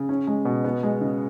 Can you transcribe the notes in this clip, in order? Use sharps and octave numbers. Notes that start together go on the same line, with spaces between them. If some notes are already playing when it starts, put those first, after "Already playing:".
Already playing: C#3
C#4
G#3
B2
B3
G#3
C#3